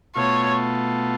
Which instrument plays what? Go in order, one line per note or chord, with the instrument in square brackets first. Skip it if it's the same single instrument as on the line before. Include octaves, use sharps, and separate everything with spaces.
[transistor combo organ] B2 A3 F4 [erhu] C#5